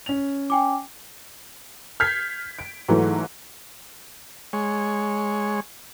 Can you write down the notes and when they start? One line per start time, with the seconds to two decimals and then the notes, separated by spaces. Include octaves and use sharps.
0.06 C#4 F7
0.50 G5 G#5 D6
2.00 F6 G6 G#6 B6 C7
2.59 D7
2.88 G#2 E3 F#3 A3
4.53 G#3 C#5